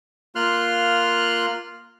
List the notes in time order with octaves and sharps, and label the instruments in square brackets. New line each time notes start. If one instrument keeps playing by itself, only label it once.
[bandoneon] A#3 F4 C6 F6 F#6